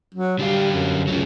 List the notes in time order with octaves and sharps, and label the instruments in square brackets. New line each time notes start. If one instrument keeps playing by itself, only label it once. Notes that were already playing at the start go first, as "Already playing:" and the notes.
[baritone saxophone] F#3
[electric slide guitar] D3 G4 F5 [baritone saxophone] G3
[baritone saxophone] F#2
[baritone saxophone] C#2 [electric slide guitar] F#3 A3 C#4